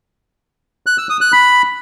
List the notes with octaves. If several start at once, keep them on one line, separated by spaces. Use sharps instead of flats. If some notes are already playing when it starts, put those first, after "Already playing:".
F#6
E6
D#6
F#6
B5